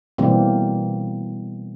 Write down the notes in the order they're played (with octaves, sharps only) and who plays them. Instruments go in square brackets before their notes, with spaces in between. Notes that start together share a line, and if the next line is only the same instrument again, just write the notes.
[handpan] B2 E3 G3 A#3 C4